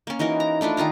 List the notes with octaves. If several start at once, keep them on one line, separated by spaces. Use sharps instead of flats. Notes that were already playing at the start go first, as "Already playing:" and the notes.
A#3 C#4
E3 D#4 F#4 A#4
A#5
A3 D4 E4 F4
D#3 D#4 F4 A#5